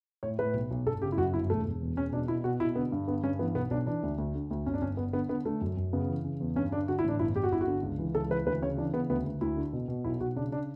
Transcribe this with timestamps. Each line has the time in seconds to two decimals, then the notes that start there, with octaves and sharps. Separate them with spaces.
0.23 A2 C#5
0.39 A2 B4
0.54 B1
0.71 B1
0.86 G1 A4
1.02 C#3 G4
1.12 E4
1.17 F#2 F#4
1.34 G1 E4
1.49 E1 A3
1.65 E1
1.81 E2
1.96 E1 C#4
2.13 B2 D4
2.28 B2 E4
2.44 B2 F#4
2.60 B2 E4
2.75 D3 B3
2.92 G2
3.07 D3 B3
3.23 G2 C#4
3.39 E3 B3
3.55 B1 B3
3.71 B1 D4
3.87 E3 D4
4.03 D2
4.18 D2
4.35 D3
4.51 D2
4.66 G1 C#4
4.74 D4
4.82 G1 C#4
4.97 G1 B3
5.13 D3 B3
5.29 D3 B3
5.45 D3 A3
5.61 F#2
5.77 F#2
5.93 C#3 B3
6.08 E3
6.25 C#3
6.40 E2
6.56 G2 C#4
6.72 D3 D4
6.88 D3 F#4
6.99 E4
7.04 A1 D4
7.19 G1 E4
7.35 G1 G4
7.43 F#4
7.52 G1 E4
7.61 F#4
7.67 D3
7.83 C#2
7.99 E3
8.14 C#2 A4
8.30 E3 B4
8.46 D2 B4
8.62 C#3 C#5
8.78 E3 D4
8.93 C#3 B3
9.10 D2 B3
9.25 D2
9.41 D2 E4
9.57 D3
9.73 B2
9.88 B2
10.04 B1 E4
10.21 B1 F#4
10.36 C#3 D4
10.52 D4